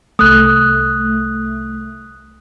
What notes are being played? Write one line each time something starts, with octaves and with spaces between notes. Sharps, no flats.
C2 A3 D#6 F#6